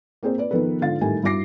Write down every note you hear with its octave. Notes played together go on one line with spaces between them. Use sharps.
A#3 C4 G#4 C5
B4 D5
D#3 F3 B3 A4 B4
G#2 D3 D4 F4 F5 A6
A2 D#3 G3 G#5
G2 E4 F#4 D6 A#6 C7